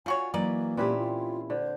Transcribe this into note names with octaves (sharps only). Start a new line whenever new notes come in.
D3 F4 F#4 C#5 G#5
E3 F#3 A#3 D#4 B4 D5
A#2 C4 C#4 E4 G4 B4
F4
D3 C5